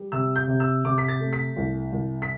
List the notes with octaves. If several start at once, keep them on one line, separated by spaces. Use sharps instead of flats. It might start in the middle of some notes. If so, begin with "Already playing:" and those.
Already playing: G3
C3 E6
G6
C3
E6
C3 D6
B6
A6
A3
B6
C2
C2
B6